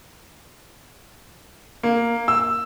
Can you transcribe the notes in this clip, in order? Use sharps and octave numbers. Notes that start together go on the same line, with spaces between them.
A#3
E6